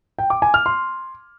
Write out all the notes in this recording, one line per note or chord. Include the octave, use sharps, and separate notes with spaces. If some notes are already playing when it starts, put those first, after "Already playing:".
G5
D6
G#5
F6
C6